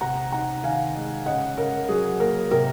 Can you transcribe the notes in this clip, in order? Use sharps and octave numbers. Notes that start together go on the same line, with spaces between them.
C3 F#5 A#5
D#4 F#5 A#5
D#3 F5 G#5
G#3
C#3 D#5 F#5
C#3 A#4
F#3 G#4
A#3 A#4
C3 A#4